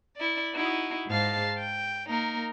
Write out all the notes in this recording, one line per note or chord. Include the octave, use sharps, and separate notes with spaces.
E4 D5
D#4 E4 F#4
G#2 G#3 C5 F5 A5
G5
A#3 D#4 A#4